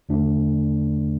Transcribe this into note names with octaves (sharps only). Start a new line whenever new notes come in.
E2 D3 A3 D4